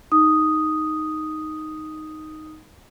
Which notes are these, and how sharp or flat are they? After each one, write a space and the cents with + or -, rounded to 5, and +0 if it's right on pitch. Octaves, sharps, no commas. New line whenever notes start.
D#4 +0 D#6 +0